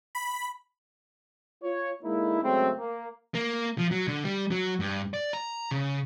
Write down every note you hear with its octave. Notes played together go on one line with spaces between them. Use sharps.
B5
F4 C#5
D3 G#3 A#3 D#4 E4
C#3 F#3 G#3 A3 C4
A#3
A#3
F3
F#3
D3
G3
F#3
G2
D5
A#5
C#3